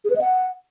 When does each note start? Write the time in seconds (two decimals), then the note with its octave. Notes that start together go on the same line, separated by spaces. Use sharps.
0.05 G#4
0.10 B4
0.16 D#5
0.21 F#5